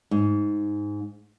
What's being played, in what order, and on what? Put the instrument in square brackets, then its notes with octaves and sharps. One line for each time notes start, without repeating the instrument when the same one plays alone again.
[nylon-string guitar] G#2